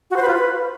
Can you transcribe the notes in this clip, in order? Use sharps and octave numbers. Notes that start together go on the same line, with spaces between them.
F#4
C5
B4
F4
B4